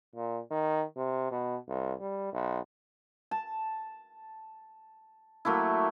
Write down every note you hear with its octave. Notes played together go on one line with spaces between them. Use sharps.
A#2
D#3
C3
B2
C2
G3
B1
A5
F#3 A3 A#3 E4